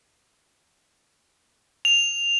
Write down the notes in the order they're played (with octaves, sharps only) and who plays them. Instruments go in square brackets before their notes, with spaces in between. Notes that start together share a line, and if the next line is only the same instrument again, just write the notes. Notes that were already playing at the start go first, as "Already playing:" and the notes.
[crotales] F7